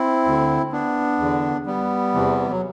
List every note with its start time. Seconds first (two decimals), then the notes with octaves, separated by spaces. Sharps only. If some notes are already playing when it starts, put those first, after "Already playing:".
Already playing: C4 E4
0.25 D2 D3
0.72 B3 D4
1.19 E2 D3
1.66 G3 B3
2.14 E2 C3 E3
2.50 F#3